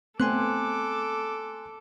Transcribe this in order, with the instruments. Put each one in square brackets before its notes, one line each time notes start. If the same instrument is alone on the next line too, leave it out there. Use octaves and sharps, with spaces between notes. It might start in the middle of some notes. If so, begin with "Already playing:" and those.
[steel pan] A3 B3 C4 [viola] A4 D6 [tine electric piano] G#5 C6 F#6